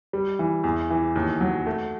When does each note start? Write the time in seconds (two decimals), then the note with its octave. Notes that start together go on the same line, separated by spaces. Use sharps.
0.13 G3
0.39 E3
0.64 E2
0.90 E3
1.16 D#2
1.41 F#3
1.67 A3